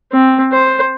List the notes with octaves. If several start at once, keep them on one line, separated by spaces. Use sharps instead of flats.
C4
C5